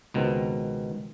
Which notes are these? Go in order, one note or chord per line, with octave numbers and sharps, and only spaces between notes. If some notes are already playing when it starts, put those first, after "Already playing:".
C#2 B2 D#3 C4